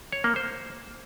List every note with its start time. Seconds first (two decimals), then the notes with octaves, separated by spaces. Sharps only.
0.12 C#5
0.24 A#3
0.36 C5